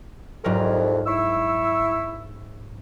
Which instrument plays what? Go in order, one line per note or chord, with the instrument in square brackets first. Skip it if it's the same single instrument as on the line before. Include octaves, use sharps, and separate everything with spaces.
[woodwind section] C2 F2 [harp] G#2 F#3 A#4
[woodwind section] E4 C#6 E6